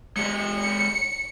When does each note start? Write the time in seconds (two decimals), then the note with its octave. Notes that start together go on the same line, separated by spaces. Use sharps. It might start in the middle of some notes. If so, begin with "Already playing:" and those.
0.17 G#3 G4 D#5 C#7